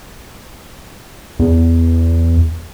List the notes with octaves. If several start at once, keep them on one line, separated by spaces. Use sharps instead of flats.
E2